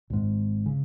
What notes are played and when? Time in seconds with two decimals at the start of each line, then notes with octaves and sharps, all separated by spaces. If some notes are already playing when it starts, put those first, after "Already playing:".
0.10 G#1 G#2
0.66 C#3